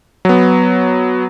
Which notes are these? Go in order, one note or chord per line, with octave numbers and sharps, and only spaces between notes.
F#3 B3